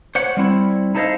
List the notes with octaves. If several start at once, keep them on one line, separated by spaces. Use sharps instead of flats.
C5 C#5 F#5
G3 C4 E4
D#4 E4 A4 C5 D#5 F5